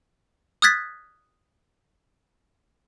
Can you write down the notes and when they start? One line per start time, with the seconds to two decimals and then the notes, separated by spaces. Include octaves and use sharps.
0.62 D#6 F6 F#6 G#6 A6 B6